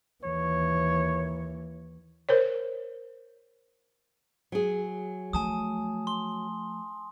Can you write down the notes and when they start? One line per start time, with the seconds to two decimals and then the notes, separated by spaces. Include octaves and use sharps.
0.24 D#2 E3 C#5
2.29 A#4 C5 C#5
4.52 F#3 G#4
5.33 F3 A3 G#5 A5 D#6
6.07 C6